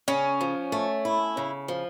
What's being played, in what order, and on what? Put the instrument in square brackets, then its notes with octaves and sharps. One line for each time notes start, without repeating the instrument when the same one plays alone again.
[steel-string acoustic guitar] C#3 [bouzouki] C#4
[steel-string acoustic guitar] F3
A3
E4
C#3
F3